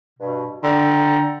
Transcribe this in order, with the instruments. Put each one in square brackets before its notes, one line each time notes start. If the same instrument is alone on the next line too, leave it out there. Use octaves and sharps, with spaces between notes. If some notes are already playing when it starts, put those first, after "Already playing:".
[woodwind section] G2 B2
[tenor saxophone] D3 [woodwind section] G5 A#5